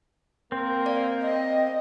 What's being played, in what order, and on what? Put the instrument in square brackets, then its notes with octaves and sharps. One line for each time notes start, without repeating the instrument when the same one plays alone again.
[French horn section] A#3 A#4 [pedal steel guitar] C4
[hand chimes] D5 F5
[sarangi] D#5